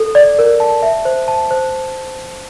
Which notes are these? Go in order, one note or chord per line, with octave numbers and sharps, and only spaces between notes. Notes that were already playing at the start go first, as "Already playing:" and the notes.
Already playing: A4
D5
A#4
A5
E5
C5
A5
C5